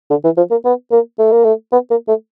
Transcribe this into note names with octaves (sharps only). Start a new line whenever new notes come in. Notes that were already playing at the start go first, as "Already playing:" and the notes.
D3
E3
F3
A#3
B3
A#3
A3
A#3
A3
B3
A#3
A3